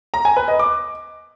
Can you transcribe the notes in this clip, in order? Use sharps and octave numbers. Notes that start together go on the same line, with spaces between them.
A#5
G#5
B4
D#5
D6